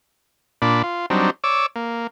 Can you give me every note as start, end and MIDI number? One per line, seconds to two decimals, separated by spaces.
0.62 0.82 46
0.62 0.82 62
0.62 0.82 74
0.62 0.82 83
0.83 1.06 65
1.10 1.30 54
1.10 1.30 55
1.10 1.30 60
1.10 1.30 62
1.10 1.30 63
1.44 1.66 73
1.44 1.66 74
1.44 1.66 86
1.44 1.66 88
1.76 2.07 58